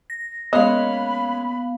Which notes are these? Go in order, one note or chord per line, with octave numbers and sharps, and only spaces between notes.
A#6
G#3 A#3 B3 C#4 D#5 F5 B5